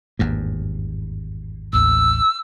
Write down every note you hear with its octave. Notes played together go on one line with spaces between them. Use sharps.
G#1 E2 G2 A#3
A1 D#2 E6